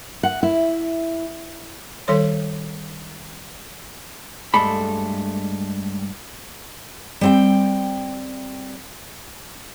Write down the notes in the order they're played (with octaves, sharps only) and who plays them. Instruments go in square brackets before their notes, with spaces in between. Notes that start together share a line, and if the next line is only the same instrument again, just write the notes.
[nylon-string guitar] F#5
E4
[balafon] D#3 G3 A4 C#5 C6
[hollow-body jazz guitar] G2 G#3 A3 A4 B5
[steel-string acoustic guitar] G3 C4 G5